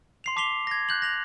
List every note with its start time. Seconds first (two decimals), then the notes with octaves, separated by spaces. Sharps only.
0.24 C6 C7 F7
0.36 A5 D6 B6 C7 F7 G7
0.67 G#6 A#6
0.89 F#6 G6 F#7
1.02 A#6 F7 F#7